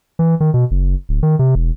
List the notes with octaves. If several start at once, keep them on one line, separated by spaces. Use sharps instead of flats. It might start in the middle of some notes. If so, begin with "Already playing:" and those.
E3
D#3
B2
F#1
D1
D#3
C3
E1